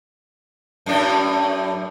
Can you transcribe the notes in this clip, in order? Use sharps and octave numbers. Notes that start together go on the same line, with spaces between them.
F#2 A2 D4